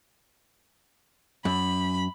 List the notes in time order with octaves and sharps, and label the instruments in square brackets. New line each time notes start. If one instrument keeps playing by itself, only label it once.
[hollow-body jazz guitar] F#2 [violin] B5